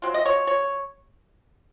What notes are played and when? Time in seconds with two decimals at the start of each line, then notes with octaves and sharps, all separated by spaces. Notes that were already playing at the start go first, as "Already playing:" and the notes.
0.02 F#3 C4 F4
0.14 D#5
0.26 C#5
0.47 C#5